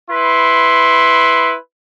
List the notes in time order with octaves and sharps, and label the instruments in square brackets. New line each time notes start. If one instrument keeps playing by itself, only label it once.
[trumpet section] E4 B4 C6